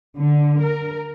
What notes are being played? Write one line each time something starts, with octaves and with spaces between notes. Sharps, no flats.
D3
A#4